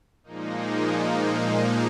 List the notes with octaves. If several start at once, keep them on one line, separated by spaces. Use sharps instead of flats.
A#2 F3 G#3 A#3 D#4